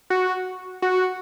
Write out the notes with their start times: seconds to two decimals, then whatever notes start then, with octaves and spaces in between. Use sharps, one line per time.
0.10 F#4
0.82 F#4